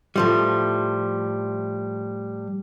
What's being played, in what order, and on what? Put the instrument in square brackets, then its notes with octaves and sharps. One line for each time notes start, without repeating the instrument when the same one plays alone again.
[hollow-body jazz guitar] A2 F3 G3